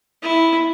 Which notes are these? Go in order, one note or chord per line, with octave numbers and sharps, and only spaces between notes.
E4